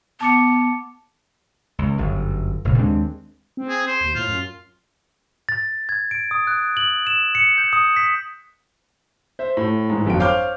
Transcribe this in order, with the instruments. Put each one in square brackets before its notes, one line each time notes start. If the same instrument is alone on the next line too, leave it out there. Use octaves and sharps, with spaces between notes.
[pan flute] B3 [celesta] A5 D6 C#7
[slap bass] C#2
G1 F#2
F1 A#2 C#3
D#2 G#3 C4 D4
[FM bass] C4
[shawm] G#4
C5
[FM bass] D#2
[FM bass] A2 [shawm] F4
[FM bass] F#2
[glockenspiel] A6
G#6
D7
D#6
F#6
F#7
E7
C#7
G6
D#6
B6
[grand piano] C5 E5
A2
G#2 E3
G1 F2 F#3 G5 D7
C5 C#5 F5 D6 F6 G6